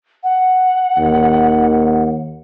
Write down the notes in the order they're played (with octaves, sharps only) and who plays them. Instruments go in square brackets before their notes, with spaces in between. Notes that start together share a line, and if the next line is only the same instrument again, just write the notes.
[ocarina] F#5
[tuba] D#2